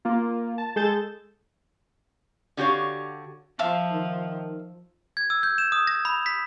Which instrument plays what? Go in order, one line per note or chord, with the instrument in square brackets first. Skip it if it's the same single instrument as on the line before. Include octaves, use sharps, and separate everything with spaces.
[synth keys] A#3 F4
A5
G#3 G#4 A4 G6 A6 E7
[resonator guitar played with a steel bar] D3 F#4 G4 C#5 F5
[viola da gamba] F3 [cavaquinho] E5 F5 A5
[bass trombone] D#3
[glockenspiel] G#6
E6
G6
E7
D#6
A#6
B5
B6